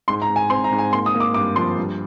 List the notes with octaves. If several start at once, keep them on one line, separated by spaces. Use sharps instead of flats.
G#2 C6
A#5
G#2
G#5
C4 C6
A#5
G#2
G#5
A#3 C6
D#6
A#3
D6
G2 D6
F3 C6
G2